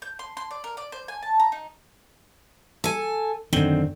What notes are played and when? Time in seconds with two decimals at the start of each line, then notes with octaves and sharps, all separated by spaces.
0.02 G6
0.19 C6
0.37 C6
0.51 D5
0.64 A#4
0.77 D5
0.92 C5
1.08 G#5
1.23 A5
1.40 A#5
1.52 D#4
2.84 A4 G#5
3.53 F#2 D3 D#3 C4